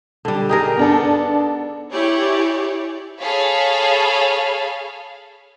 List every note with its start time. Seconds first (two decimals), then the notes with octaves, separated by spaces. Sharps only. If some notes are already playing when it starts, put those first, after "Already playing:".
0.25 D3 G3
0.49 D#4 G4 G#4 A#4
0.77 B3 D4 A4
1.93 E4 G4 G#4 C#5 D5
3.21 G#4 A4 C#5 F5 B5